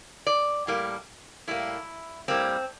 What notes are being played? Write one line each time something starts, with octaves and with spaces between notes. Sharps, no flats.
D5
A2 G3 A#3
A2 G3 A#3 E4
A2 G3 A#3 C4